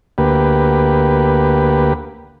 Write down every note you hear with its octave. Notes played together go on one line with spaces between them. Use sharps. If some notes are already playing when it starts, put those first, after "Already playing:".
D2 A#3 G4 B4